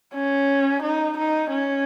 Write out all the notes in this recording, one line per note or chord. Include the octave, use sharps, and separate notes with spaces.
C#4
D#4
D#4
C#4